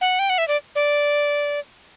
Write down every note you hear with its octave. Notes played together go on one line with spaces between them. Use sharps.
F#5
G5
F#5
E5
D5
D5